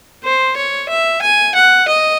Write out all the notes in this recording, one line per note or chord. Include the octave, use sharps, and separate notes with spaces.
C5
C#5
E5
G#5
F#5
D#5